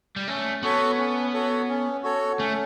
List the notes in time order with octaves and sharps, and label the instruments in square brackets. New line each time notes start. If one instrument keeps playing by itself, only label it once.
[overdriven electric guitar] G3
[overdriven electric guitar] A3 [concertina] C#4
[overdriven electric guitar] B3 [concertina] F#4 A4 C#5
[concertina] C#4
F#4 A4 C#5
C#4
F#4 A4 C#5
[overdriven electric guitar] A3 [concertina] C#4